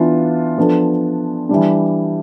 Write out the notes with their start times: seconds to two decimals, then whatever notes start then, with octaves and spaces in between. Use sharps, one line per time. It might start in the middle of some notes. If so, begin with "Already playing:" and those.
Already playing: E3 B3 D4 F4
0.58 F3 B3 D4 A4
1.49 E3 G3 D4